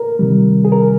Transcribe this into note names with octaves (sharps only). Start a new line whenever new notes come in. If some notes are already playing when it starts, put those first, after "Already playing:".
Already playing: A#4
C3 D#3 G3
G#4
A#4